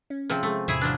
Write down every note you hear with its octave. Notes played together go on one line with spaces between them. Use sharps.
C#4
C3 F3 C4 G#4
G#3 A3 G#4
E2 A2 C3 E4 G#4 E5
F3 F#3 D4